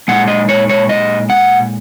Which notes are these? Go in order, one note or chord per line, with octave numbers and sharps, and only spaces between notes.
A#2 G#3 F#5
D#5
C#5
C#5
D#5
F#5